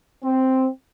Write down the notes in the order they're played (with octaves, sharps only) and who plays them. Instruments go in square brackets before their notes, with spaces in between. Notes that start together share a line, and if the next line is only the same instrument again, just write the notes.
[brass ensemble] C4